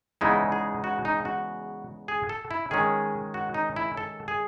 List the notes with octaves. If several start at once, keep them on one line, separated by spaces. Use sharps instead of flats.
E2 C#3 G#3 B3 D#4 E4
G#4
F#4
D#4
F#4
G#4
A4
E4
D#3 G#3 C#4 G#4
F#4
D#4
E4
A4
G#4